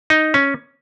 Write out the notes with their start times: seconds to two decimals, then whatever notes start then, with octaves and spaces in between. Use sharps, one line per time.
0.10 D#4
0.34 C#4